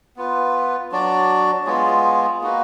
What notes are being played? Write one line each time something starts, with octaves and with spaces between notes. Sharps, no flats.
B3 F4 B4
F#3 D4 F#4 D5
G#3 B3 F4 G#4
A#3 D#4 F#4 B4